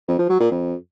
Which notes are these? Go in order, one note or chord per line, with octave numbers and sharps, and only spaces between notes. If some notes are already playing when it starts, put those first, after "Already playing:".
F2
F3
F#3
A#2
F2